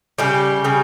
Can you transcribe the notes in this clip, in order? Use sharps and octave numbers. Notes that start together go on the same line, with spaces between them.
C#3 G3 G4
C#3 G3